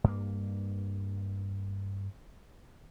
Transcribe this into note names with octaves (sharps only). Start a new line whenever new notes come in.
G2 A#3